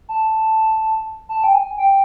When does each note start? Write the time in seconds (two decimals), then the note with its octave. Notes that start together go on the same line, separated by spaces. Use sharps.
0.09 A5
1.29 A5
1.44 G5
1.53 G#5
1.78 G5